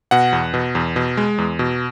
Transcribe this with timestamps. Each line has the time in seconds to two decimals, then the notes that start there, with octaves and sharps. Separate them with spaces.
0.11 B2 F#5
0.33 E2
0.54 B2
0.75 E2
0.96 B2
1.17 G#3
1.38 E2
1.59 B2